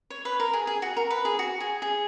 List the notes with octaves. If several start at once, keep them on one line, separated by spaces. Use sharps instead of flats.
C#5
B4
A#4
G#4
G#4
F#4
A#4
B4
G#4
F#4
G#4
G#4